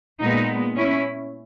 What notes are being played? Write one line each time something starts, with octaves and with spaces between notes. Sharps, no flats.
A#2 G#3 B3 D#4
C#4 E4